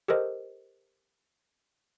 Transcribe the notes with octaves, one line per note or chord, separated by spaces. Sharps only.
G4 A4 A#4 C5 D#5